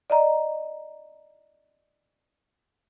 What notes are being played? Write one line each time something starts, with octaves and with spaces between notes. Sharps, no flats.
D5 D#5 A#5